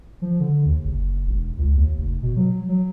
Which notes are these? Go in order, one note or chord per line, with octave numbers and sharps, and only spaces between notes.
F3
D3
D#2
F#1
E1
C#2
D#2
F1
B2
F#3
F#3